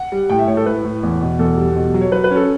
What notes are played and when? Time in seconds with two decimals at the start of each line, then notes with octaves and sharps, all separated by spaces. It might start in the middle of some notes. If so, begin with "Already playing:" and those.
Already playing: F#5
0.12 G3
0.29 A2 G5
0.39 E5
0.47 A2 C#5
0.57 A4
0.66 A2 B4
0.85 A2
1.03 E2
1.21 B2
1.39 E2 A4
1.57 G3
1.75 B2
1.94 F#3
2.01 C#5
2.12 F#3 B4
2.24 B4
2.31 C#4
2.36 A4